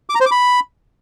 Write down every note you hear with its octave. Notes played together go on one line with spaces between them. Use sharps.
D6
A#5
C5
D6
B5